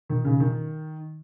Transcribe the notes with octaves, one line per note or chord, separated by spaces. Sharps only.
D#3
C#3
D#3